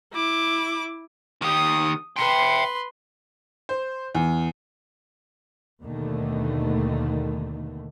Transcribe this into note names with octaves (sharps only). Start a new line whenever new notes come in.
E4 D6
D#3 G4 D#6
B4 E5 G5 C6
C5
E2
D#2 B2 D3 D#3 A3